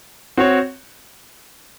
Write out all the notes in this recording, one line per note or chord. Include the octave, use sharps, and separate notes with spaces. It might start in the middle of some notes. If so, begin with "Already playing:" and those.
C4 F#4 C#5